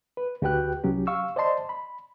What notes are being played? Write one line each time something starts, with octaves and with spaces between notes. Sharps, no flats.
B4
D2 F#4 G4 B4 G5 F#6
C2 F#3 C#4 G4
F5 C#6 E6
C5 D5 D#5 A5 C6
B5